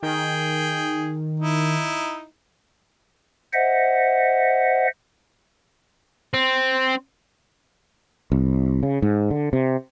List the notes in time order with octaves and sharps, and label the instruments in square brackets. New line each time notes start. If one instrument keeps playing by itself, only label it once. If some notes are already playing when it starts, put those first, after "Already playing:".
[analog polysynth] D#3 [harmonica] G#4 G5
[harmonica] D#4 E4
[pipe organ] C5 D#5 E5 F#5
[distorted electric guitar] C4
[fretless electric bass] C2
C#3
G#2
D3
C3